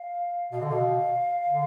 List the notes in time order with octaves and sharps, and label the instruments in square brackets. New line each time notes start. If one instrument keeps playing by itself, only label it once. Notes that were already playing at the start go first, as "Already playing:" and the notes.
Already playing: [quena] F5
[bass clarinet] B2 [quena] F5
[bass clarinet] D3 [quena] D#5
[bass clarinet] B2 [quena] F5
[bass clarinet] D3